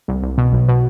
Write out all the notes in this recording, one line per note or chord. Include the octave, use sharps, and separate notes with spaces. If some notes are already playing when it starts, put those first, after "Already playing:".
C2
C2
B2
B1
B2